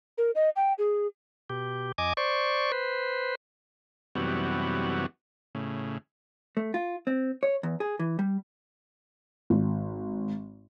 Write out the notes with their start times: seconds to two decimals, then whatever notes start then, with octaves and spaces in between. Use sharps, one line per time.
0.18 A#4
0.35 D#5
0.56 G5
0.78 G#4
1.50 B2 G4
1.98 F2 D#5 G#5 D6
2.17 C5 D5 C#6
2.72 B4 C5
4.15 F#2 C3 E3 G3 B3 F#4
5.55 A2 C#3
6.57 A3
6.74 F4
7.07 C4
7.43 C#5
7.63 E2
7.80 G#4
7.99 E3
8.19 G3
9.50 G#1